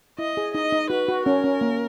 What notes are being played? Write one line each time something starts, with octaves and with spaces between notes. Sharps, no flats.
E4 D#5
G#4
D#4 D#5
D#4
F#4 B4
F#4
C#4 A#4
C#4
A#3